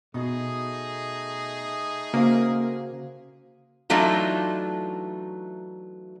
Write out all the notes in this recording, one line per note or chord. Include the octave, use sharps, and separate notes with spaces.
B2 A3 D#4 G#4
C#3 A#3 F#4 C5 F5
E3 F#3 A3 D4 D#4 F4